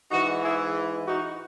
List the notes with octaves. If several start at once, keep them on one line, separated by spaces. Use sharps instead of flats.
G#2 E3 D#4 F#4
E4 G#4
D#4 F#4